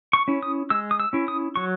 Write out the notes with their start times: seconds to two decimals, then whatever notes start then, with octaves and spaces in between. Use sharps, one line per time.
0.13 C#6
0.28 C#4 E4
0.43 D#6
0.70 G#3 E6
0.91 D#6
1.00 E6
1.13 C#4 E4
1.28 D#6
1.56 F#3 C#6